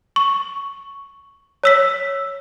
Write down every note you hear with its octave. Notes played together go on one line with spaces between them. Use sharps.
C#6
C#5 E6 B6